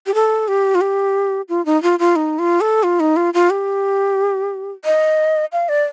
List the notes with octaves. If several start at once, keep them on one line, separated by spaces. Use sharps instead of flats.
G4
A4
G4
F4
G4
F4
D#4
F4
F4
D#4
F4
A4
F4
D#4
F4
F4
G4
D#5
F5
D5